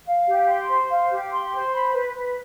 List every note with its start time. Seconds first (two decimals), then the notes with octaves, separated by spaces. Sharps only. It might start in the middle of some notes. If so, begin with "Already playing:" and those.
0.06 F5
0.27 G4
0.48 C6
0.69 C5
0.89 F5
1.11 G4
1.32 C6
1.53 C5
1.73 B5
1.94 B4
2.15 B4